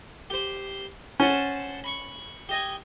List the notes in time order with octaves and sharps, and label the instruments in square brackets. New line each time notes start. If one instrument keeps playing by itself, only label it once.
[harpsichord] G4 C5
[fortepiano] C#4 [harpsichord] C5 F#5 A5
[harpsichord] B5 C#6
G4 D#5 G#5